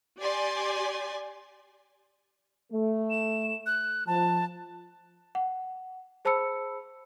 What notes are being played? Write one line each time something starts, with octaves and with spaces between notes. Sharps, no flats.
G4 D5 G#5 C6
A3
E7
F#6
F3 A5
F#5
G#4 C5 A5 B5 E6 C#7